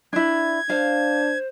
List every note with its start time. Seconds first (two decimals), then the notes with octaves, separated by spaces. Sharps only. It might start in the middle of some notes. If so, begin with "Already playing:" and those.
0.13 D4 E4 G#6
0.70 D4 C5 F5